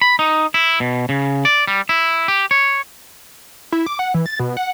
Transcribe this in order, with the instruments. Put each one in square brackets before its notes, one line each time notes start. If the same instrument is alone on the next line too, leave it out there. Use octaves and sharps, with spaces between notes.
[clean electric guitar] B5
D#4
E4
B2
C#3
D5
G3
E4
G4
C#5
[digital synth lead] E4
D6
F#5
E3
A6
B2
F#5